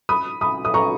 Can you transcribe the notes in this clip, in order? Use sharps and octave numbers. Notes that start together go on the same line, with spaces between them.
B5 D#6
B5 D#6
D#6
A#5 C#6